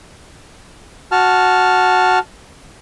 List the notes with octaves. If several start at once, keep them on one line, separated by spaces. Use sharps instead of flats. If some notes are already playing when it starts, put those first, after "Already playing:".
F#4 A5 F6